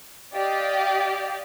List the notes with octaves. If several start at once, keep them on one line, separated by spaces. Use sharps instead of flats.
G4 D5 D#5 F5